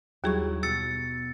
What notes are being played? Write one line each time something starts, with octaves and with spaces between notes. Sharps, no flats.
D#2 F#3 G3 E4 G#4 C#6
B2 E6 A6 C#7